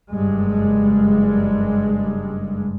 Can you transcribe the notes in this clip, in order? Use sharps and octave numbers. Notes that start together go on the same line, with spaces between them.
F#1 G2 G3 G#3